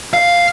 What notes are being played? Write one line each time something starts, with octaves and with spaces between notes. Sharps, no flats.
F5